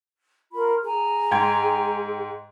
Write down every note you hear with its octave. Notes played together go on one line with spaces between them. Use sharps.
F4 A#4 B5
G#4 G#5 A#5
G#2 G5 G#6